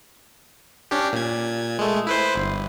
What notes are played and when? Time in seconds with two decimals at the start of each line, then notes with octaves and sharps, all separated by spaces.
0.91 C#4 D4 G4
1.13 A#2 G#6
1.79 G#3 A3
2.07 E4 B4 C5
2.36 G1